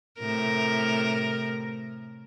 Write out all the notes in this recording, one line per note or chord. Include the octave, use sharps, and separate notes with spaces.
A2 C3 A#4